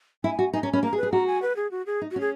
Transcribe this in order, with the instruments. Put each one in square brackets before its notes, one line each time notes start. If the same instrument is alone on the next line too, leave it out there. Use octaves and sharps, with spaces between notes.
[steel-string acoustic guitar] E4 [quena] G#5
[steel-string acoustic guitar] F#4
[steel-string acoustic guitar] D#4 [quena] G#5
[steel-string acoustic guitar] C#4 [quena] A#5
[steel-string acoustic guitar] C#4 [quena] B5
[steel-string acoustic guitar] A#3 [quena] A#5
[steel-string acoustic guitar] G#4
[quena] B4
[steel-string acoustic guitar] G#4
[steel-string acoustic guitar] F#4 [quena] A#5
[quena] G#5
B4
G#4
F#4
G#4
[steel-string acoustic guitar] D#4
[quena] F#4
[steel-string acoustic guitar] C#4 [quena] G#4